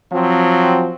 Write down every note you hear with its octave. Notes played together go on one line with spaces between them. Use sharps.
F3 F#3 C4